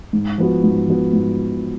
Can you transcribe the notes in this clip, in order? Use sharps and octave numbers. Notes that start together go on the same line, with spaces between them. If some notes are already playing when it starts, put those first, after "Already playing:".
G#2
F3 B3 F#4
G#2
F3 B3 F#4
G#2